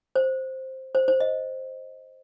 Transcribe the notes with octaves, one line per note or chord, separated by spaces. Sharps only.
C5
C5
C5
D#5